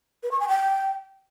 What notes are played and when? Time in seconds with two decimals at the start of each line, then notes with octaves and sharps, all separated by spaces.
0.23 B4
0.32 C#6
0.40 G#5
0.48 G5